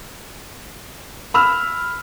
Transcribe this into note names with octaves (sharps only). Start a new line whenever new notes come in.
B5 E6 F6